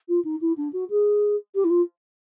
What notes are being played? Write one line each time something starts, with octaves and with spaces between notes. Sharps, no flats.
F4
D#4
E4
D4
F#4
G#4
G4
E4
F4